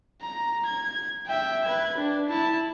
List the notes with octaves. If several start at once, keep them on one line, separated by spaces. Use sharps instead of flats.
A#5
G#6
E5 G5
B4 G#6
D4
E4 A5